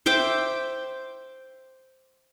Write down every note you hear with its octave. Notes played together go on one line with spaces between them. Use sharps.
C5 E5 G5 D6